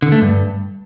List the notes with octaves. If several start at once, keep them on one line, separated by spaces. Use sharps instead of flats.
D3
A3
G2